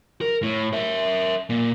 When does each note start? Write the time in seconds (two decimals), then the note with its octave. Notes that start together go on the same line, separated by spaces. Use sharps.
0.21 A#4
0.43 A2
0.73 A#4 E5
1.50 A#2